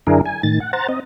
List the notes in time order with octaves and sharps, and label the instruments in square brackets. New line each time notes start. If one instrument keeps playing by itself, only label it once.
[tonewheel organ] F#2 D3 D4 E4 G#4 A#4
G#5
A2 D#3 A6
F#5
C5 F#5 A#5 A6
C4 D#5